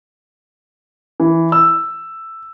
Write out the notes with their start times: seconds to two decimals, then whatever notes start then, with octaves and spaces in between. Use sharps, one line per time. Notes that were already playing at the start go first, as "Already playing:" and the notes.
1.20 E3
1.52 E6